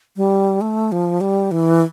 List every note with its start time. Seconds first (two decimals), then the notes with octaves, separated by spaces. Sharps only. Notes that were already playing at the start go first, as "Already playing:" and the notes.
0.16 G3
0.61 A3
0.92 F3
1.21 G3
1.51 E3